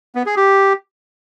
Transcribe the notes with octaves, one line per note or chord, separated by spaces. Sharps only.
B3
G#4
G4